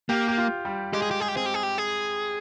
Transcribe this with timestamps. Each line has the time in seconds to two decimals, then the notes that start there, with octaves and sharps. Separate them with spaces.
0.09 A#3 G4
0.28 G4
0.38 F4
0.65 G3
0.93 G#3 G4
1.02 G#4
1.11 G4
1.20 G#4
1.28 G4
1.35 C4 G#4
1.46 G4
1.54 G#4
1.63 G4
1.78 G#4